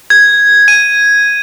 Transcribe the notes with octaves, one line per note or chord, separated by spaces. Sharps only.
G#6
D#7